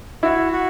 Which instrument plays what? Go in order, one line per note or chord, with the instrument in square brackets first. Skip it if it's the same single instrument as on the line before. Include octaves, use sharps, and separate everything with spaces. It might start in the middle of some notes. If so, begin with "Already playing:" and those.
[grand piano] E4 [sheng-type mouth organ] F#4
[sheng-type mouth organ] F#4